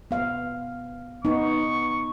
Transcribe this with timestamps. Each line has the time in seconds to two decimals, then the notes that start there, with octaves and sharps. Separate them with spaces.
0.11 B3 F5
1.25 B3 D#4 C#6